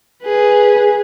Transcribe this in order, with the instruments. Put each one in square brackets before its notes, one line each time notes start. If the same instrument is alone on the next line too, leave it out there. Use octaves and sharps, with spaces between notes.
[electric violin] G#4 B4